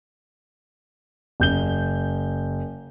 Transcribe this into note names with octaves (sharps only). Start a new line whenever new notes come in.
F#1 G6 G7